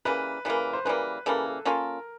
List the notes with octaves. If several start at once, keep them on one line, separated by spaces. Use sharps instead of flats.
C#3 E3 G3 A#3 B4
C#3 E3 G3 A#3 B4
C5
C#3 E3 G3 A#3 B4
C#3 E3 G3 A#3 A4
A4
A#3 C#4 F4 A4 A#4